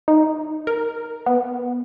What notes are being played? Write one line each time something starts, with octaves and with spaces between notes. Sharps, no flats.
D#4
A#4
B3